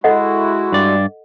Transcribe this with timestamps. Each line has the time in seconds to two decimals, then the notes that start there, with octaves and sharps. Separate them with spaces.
0.04 G#3 E4 F#4 A4 D#5 F#5
0.72 G2 D5